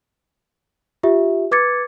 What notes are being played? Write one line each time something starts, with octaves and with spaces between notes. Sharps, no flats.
F4 G4 E5
B4 D6 G#6 A6 C#7